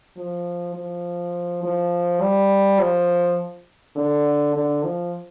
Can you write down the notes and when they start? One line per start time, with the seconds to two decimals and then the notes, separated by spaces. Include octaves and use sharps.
0.17 F3
0.75 F3
1.63 F3
2.21 G3
2.80 F3
3.96 D3
4.55 D3
4.84 F3